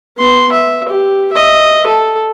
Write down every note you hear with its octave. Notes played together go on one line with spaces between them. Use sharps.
B3 C6
E5
G4
D#5 E5
A4